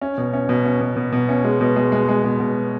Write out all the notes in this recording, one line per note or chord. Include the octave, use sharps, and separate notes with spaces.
C#4
B2
C#4
B2
C#4
B2
B2
B2
C#4
G#3
B2
G#3
G#3
G#3
B2
B2